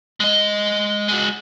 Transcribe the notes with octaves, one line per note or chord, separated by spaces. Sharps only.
G#3 D#5
G#3 F#4